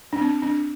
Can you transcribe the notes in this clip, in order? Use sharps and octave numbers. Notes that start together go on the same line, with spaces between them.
D4
C4
D4